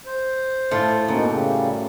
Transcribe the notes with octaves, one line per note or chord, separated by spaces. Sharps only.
C5
A2 A3 F4
F#2 B2 A#3 D#4
C#3 G3